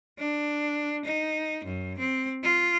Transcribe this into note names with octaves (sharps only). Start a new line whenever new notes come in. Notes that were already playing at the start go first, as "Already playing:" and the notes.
D4
D#4
F#2
C4
F4